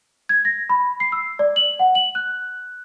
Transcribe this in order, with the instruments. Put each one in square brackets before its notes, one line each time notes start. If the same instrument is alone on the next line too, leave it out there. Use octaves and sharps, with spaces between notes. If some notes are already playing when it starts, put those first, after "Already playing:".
[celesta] G#6
A#6
B5
C7
E6
D5
F#7
F#5
F#7
F#6